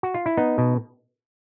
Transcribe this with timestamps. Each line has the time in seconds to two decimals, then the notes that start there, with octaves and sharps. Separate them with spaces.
0.03 F#4
0.14 F4
0.26 E4
0.37 B3 D#4
0.58 B2